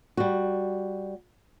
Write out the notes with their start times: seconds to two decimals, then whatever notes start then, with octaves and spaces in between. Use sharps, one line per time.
0.17 G3 F#4